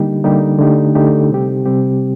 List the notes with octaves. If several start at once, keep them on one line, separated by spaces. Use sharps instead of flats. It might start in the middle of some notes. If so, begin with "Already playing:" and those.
Already playing: D3 G3 A#3 D#4 G4
D3 G3 A#3 D#4 G4
D3 A3 D#4 G4
D3 A3 D#4 G4
C3 G3 C4 G4
C3 G3 C4 G4